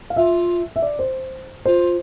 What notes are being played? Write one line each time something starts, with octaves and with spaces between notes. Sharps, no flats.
F5
F4 E5
E5
D5
C5
F4 C5